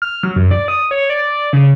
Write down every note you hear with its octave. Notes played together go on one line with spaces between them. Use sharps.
F6
F#3
F#2
D5
D#6
C#5
D5
C#3